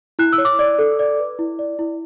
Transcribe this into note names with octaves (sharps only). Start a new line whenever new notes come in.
E4 F#6
E6
C#5
D6
D5
A4
D5
B4
E4
D5
E4